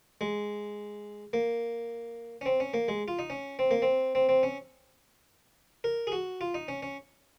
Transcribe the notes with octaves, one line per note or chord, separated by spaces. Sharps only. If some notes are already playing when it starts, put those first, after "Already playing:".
G#3
A#3
C#4
C4
C#4
A#3
G#3
F4
D#4
C#4
C4
A#3
C4
C4
C4
C#4
A#4
G#4
F#4
F4
D#4
C#4
C#4